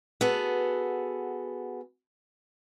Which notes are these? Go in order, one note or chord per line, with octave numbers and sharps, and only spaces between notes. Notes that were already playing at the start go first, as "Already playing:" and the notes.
B3 F#4 G#4 A4